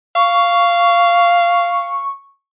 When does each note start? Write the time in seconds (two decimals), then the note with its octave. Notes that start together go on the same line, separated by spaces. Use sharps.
0.16 F5 C#6